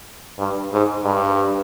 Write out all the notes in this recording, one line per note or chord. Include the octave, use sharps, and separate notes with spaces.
G2
G#2
G2